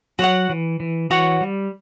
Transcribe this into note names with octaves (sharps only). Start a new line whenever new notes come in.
F#3 F#4 C#5 F#5
E3
E3
E3 F#4 C#5 F#5
G3